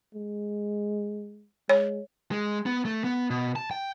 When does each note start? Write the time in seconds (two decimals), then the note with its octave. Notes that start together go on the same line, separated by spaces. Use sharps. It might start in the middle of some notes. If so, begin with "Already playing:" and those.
0.14 G#3
1.69 G#3 C#5
2.31 G#3
2.66 B3
2.85 A3
3.04 B3
3.30 B2
3.56 A5
3.71 G5